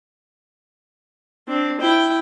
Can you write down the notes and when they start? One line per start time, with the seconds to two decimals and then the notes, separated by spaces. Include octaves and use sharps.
1.48 C4 D4
1.80 E4 G5